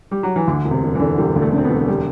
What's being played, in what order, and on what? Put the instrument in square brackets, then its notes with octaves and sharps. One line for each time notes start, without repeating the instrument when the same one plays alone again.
[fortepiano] G3
F#3
E3
[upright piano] D2 [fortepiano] D3
[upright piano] E1
[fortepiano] C3
[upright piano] E1
[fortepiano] E3
[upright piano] D3
[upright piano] E1 [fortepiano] G3
[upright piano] D2
[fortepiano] A3
[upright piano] D3
[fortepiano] C4
B3
[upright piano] E1
[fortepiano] G3